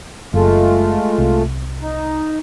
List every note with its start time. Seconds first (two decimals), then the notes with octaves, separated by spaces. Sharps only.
0.34 F#1 G#3 A3 F4
1.18 C2
1.82 D#4